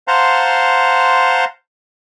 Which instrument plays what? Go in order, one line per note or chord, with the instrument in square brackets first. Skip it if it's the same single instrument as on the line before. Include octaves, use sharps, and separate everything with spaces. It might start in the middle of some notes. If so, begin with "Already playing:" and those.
[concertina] C5 F5 F#5 A5 A#5 C6